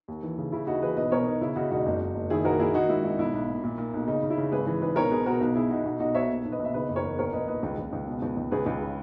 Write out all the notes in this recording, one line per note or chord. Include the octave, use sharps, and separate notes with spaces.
D#2
E3
C#3
C#3 E4
D#2 D#4 F#4
E3 G#4 B4
B1 B4 D#5
B2 A#4 C#5
B2 D#4
C#3 E4
C#3 D#4 F#4
E1 D#4 F#4
F#1
F#1
F#1
D#3 E4 G#4
A#1 F#4 A#4
A#1 E4 G#4
D#3 D#4 F#4
G#2 E4
G#1 E4
B1 E4
B1
A#2
A#2
A#2
B1
C#3 D#4
C#3
E4
C#3
G#1 G#4 B4
E3
G#1 G#4 B4
B1 A#4 C#5
B2 G#4 B4
B2 F#4 A#4
B1
B2 E4 G#4
B2 D#4 F#4
B1 D#4 F#4
B1 D#4 F#4
B1 C#5 E5
A#2
B1
B4 D#5
B1
E5
C#3 B4 D#5
F#1
A#4 C#5
E2
A#1 A#4 C#5
A#1 B4 D#5
A#2 B4 D#5
C#2
C#2
C#2
B2
C#2
C#2
C#2 G#4 B4
C#2
C#3